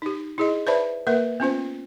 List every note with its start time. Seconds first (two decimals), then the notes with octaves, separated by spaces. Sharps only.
0.02 D#4 G4
0.38 E4 G#4 D#5
0.67 B4 C5 D5 E5 A5 B5
1.07 A#3 A#4 B4 E5
1.40 B3 C#4 F4 C5